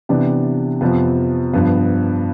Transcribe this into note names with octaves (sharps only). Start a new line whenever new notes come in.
C3 E3 B3 D4 G4
F2 C3 F3 B3
G2 F3 B3